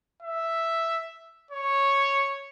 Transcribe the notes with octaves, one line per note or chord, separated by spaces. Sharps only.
E5
C#5